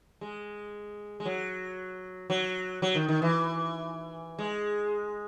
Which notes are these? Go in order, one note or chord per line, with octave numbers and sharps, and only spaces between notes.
G#3
G#3
F#3
F#3
F#3
D#3
D#3
E3
G#3